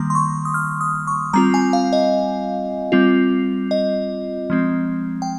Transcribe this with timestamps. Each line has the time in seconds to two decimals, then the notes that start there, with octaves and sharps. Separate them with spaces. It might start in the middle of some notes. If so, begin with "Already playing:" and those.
Already playing: D#3 G3 A#3 C6
0.10 C6
0.15 C#6
0.45 D#6
0.54 F6
0.81 D#6
1.07 C#6
1.33 G3 C4 F4 A#5
1.54 G#5
1.73 F5
1.93 D#5
2.92 G3 C4 F4
3.71 D#5
4.50 F3 G#3 C4
5.22 G5